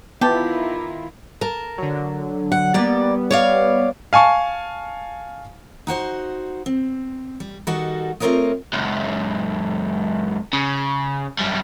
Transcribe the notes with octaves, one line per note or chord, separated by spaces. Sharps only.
D#3 B3 E4 F4 G4 A5
A#4 A5
D3 F#3
F#5
G3 A#3 B3 D5
C#5 D5 F5
F5 G#5 A5 C#6
D#4 F#4 C5 F#5
C4
G3
D#3 G3 F#4 A4 D#5 F#5
A3 C4 F4 A#4 C#5 D#5
C#2 F#2
C#3
F#2 G3